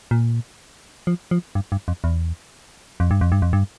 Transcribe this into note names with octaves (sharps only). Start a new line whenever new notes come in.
A#2
F3
F3
G2
G2
F2
E2
F2
G2
F2
G2
F2
G2